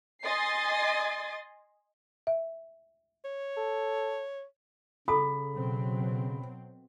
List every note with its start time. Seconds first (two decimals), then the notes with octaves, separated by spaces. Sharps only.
0.24 D#5 G#5 C6 D#6 A6 C7
2.27 E5
3.25 C#5
3.57 A4
5.08 C#3 A4 A#5 B5 D#6
5.54 B2 F#3 C4